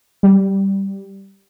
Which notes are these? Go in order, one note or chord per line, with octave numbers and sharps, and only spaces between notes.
G3